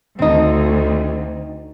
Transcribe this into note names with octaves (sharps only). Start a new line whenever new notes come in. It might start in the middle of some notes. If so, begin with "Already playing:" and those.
D2 C4 D#4